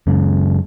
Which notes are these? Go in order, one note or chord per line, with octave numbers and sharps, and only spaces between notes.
F#2 C#3 G#3